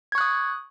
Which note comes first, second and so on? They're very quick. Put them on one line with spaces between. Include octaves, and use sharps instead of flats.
G#6 C#6 F#6 D#6